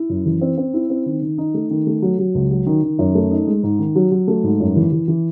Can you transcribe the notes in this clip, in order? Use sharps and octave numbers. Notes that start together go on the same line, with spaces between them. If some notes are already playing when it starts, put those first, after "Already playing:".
Already playing: E4
F#2
E3
C4
C4
E4
C4
D#3
D#3
D#4
A3
D#3
A3
F#3
F#3
C#2
F#3
D#3
D#3
F#2
A3
D#4
G#3
G#2
D#3
F#3
F#3
A3
G#2
F#2
E3
E3
E3